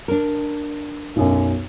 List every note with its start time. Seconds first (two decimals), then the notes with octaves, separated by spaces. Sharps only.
0.08 D4 A#4
1.16 B1 F#2